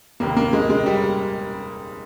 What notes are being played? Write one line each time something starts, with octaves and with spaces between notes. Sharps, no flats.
F1 D#2 D#3 A#3
A#3
G#3
G#3
G3